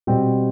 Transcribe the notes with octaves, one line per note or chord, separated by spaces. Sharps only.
B2 G3 C4 G4